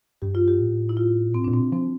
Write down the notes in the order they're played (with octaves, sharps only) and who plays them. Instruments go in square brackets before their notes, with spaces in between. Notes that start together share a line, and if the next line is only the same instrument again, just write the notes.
[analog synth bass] G2 [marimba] G4
[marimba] F4
G4
[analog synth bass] A2
[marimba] E4
F4
[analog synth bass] A#2
[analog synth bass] A2 [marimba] C4
[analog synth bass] A#2 [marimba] D4
[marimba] C4
[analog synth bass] C3
[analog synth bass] F3 [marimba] C4